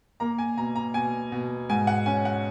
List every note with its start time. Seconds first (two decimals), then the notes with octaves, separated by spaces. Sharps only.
0.20 A#3 A#5
0.38 G#5
0.57 B2 A#5
0.75 A#5
0.94 B2 G#5
1.32 B2
1.70 G#2 G#5
1.87 F#5
2.06 C#4 G#5
2.25 F#5